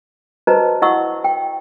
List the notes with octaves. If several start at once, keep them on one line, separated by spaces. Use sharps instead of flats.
F#4 B4 C5 D#5 A5 A#5
E4 D#5 F#5 C#6 E6
G5